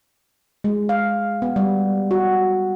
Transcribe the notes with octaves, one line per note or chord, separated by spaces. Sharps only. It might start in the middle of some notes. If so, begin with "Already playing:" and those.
G#3
F5
B3
G3
F#4